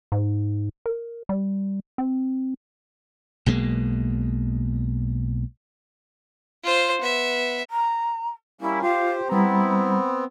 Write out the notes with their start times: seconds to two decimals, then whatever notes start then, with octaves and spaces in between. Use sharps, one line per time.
0.12 G#2
0.86 A#4
1.29 G3
1.98 C4
3.46 B1 B2 G#3 A#3
6.64 F4 C5
7.01 B3 E5
7.71 A#5
8.61 G3 A#3 C#4 E4
8.82 F4 G4 C5 F5
9.29 G3 B3 C4 E4 A#5